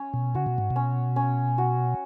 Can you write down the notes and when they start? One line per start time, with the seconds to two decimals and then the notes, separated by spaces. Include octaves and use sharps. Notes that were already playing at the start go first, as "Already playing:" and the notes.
Already playing: C#4
0.14 B2
0.35 C#3 F#4
0.46 B2
0.58 G#2
0.71 B2
0.76 C#4
1.16 C#4
1.58 F#4